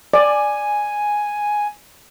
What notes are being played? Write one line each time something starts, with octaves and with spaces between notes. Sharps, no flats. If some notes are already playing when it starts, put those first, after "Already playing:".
D5 G#5